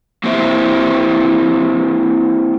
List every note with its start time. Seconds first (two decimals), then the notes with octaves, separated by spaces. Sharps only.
0.24 A#3 C4 E4 G4 C5 E5